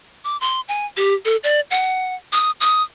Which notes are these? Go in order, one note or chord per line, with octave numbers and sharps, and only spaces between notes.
D6
C6
G#5
G4
A4
D5
F#5
D#6
D#6